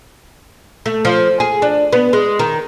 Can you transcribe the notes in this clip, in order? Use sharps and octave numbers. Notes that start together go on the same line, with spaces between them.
A3
F3
G#4
D4
B3
G#3
D#3